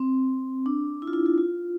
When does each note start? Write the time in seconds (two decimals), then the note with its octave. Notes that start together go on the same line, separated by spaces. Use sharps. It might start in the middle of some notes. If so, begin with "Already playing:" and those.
Already playing: C4
0.66 D4
1.02 E4
1.07 F4
1.13 E4
1.26 F4
1.38 F4